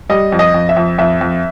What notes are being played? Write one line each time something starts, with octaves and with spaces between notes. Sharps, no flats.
G3 D#5
F2
D#5
F2
E5
F2
F2 E5
F2